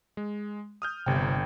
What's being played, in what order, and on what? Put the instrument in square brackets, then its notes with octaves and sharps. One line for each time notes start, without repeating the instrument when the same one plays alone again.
[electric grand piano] G#3
D#6 F6 G6
[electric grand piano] G1 G5 [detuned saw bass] C3